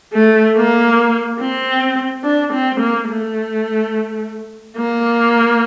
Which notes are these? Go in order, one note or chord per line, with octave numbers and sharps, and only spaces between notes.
A3
A#3
C4
D4
C4
A#3
A3
A#3